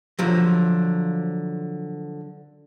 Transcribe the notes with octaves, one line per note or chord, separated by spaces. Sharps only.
D3 F3 F#3